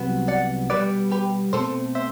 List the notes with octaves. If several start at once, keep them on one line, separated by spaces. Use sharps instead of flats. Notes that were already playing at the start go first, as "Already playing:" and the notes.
Already playing: C2 C3 F#3 B3
D5 F#5
B2 G3 B3 B4 D5
G4 B4
B2 A3 C4 A4 C5
C5 E5